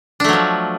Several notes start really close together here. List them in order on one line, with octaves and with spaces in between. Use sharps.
D4 A3 F#3 F3